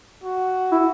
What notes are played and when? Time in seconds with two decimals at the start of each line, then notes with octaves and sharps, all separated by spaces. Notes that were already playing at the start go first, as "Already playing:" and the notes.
0.24 F#4
0.72 E4